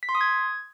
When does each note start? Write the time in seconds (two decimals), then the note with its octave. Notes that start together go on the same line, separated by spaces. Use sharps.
0.03 B6
0.09 C6
0.15 D#6
0.21 G#6